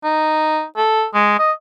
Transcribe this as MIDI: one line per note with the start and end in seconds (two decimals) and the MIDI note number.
0.04 0.64 63
0.77 1.05 69
1.14 1.35 56
1.39 1.52 75